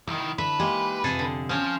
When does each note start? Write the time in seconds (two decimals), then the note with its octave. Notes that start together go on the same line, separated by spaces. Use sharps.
0.07 C2 D#3 E4
0.38 D3 A4 B4 E5
0.60 G#3 A#3 D#4 G4
1.04 F2 C3 G#4 A4
1.19 D3
1.49 F3 C4 C#4 F4